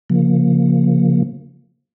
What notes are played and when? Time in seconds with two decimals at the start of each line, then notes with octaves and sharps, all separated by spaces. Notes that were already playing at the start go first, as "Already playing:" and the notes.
0.10 C#3 F3 A#3